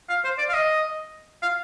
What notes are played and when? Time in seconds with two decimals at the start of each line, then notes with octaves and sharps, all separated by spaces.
0.09 F5
0.24 C5
0.38 D5
0.49 F5
0.54 D#5
1.42 F5